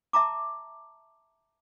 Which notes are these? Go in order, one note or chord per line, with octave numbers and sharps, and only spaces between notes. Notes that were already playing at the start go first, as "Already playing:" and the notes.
E5 A5 A#5 D6